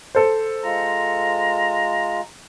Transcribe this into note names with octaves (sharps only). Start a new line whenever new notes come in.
A4 C5
G#3 F4 A#5